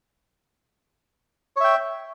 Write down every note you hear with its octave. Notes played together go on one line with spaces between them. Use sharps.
C#5 E5 G5